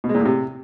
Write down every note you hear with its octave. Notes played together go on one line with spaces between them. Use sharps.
B2
G#3
A#2
A2
C3